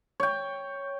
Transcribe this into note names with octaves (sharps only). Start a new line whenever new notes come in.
C#5 G5